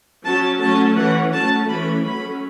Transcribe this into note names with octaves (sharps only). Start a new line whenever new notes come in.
F#3 C#4 A5
F#3 A3 C#4 A5
E3 C#4 F#5
F#3 A3 C#4 A5
E3 A3 C#4 B5
F#3 A3 C#4 B5